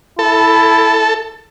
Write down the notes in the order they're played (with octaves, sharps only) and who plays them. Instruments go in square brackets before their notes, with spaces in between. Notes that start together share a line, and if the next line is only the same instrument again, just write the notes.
[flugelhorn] E4 [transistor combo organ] A4